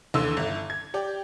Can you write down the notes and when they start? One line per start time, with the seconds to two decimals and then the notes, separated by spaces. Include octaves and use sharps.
0.14 D#2 D3 E3 C6 E6
0.37 G1 E4
0.70 G#6
0.94 G4 D5 G5